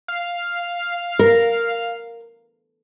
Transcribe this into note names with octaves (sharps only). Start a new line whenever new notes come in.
F5
A#4